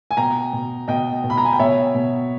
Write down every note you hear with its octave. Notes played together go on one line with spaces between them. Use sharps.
G#5
B2 G5 A#5
B2
B2 D#5 G5
B2
B5
A#5
G#5
G5
B2 C#5 E5
B2